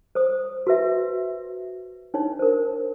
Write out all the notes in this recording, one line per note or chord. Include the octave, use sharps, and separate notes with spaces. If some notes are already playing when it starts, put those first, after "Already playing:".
C5 C#5 D#6
F#4 B4 E5
D4 D#4 C#5
A#4 C5